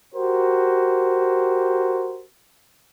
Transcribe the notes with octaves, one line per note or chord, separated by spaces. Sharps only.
F#4 G4 A#4 C5